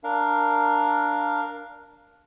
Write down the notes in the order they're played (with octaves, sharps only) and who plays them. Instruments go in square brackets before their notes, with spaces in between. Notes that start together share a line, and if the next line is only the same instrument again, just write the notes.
[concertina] D4 A#4 F5